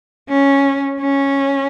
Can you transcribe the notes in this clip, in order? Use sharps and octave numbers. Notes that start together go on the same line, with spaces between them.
C#4
C#4